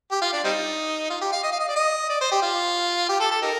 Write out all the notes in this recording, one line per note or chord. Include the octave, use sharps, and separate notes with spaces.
G4
F4
D4
G3 C4 D#4
F4
G4
F5
D#5
F5
D#5
D5
D#5
D5
C5
G4
F4
G4
A4
A4
D#4 G4 A#4